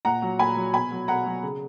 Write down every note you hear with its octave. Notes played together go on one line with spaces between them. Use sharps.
A#2 F#5 A#5
F#3
A#2 G#5 B5
F#3
B2 G#5 B5
F#3
B2 F#5 A#5
F#3
C#3